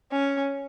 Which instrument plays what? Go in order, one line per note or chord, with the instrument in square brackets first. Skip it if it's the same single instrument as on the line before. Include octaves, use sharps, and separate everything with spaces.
[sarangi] C#4